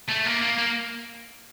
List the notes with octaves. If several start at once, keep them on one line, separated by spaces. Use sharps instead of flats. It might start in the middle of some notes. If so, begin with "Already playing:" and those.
A3
A#3
A#3
A#3